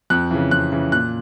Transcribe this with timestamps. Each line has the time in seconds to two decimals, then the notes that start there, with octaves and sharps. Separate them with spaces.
0.10 F2 F#6
0.31 C#3 E3
0.51 F2 F#6
0.72 C#3 E3
0.92 A#2 F#6